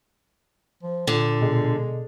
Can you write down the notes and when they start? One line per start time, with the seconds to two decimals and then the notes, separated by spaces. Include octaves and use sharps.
0.83 F3
1.07 A#2 D3
1.42 B2 G#3